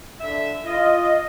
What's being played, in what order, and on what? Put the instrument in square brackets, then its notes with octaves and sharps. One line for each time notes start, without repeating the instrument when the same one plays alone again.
[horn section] D3 E5
[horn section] F4 [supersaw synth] D#5